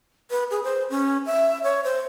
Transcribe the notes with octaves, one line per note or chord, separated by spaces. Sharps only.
B4
G#4
C5
C#4
E5
C#5
C5